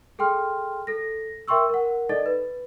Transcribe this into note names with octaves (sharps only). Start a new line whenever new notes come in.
G#4 A4 G5 C6 F6
A4 A#6
A#4 E5 G5 C6 C#6 E6
A#4 F#5
D#4 A4 D5 D#5 A6
B4